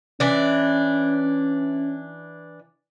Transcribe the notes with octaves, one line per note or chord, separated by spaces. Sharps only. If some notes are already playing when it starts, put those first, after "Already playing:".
E3 C#4 D4